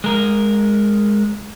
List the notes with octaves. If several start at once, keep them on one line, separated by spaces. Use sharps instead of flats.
G#3 A#4